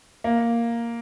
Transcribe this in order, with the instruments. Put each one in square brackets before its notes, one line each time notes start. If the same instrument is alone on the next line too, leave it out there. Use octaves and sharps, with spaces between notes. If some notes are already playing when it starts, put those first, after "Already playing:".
[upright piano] A#3